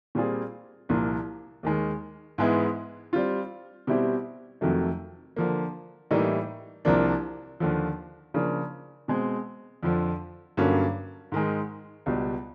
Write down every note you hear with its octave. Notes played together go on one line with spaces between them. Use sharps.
A#2 G3 C4 F4 G#4
C2 A#2 F3 A#3
D#2 D#3 G#3
G#2 E3 G#3 B3 E4
G3 C4 F4
B2 G3 C4 E4 G4
F2 C3 D#3 F#3 A3
D3 F3 A#3
A2 E3 G3 A#3 D#4
C2 C3 F3 A#3 D4
D#2 D3 F3
C#3 F3 A#3 D4
B2 G#3 C4
F2 D3 F3
G2 D3 F#3 A#3 C#4
G#2 D#3 G#3
C#2 B2 G3